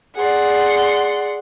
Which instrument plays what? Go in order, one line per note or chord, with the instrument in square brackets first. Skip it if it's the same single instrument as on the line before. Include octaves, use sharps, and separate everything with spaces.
[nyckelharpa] G#4 D5 [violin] F#5 C6